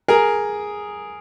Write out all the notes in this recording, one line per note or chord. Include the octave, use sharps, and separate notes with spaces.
G#4 A#4